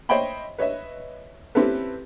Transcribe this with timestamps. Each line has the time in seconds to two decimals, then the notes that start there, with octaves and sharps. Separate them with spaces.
0.09 C5 C#5 D#5 E5 G5 B5
0.58 B4 C#5 D#5 E5
1.55 C4 C#4 E4 G4 A4 B4